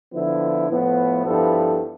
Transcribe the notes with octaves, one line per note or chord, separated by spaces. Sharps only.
D3 F3 B3 E4
A2 F3 B3
G2 F3 B3 E4 A4